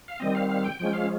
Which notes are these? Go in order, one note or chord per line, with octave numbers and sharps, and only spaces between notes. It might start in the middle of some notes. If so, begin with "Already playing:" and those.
F5
D#3 G3 C4 D#5
F5
F5
G5
F3 G#3 C#4 G5
F5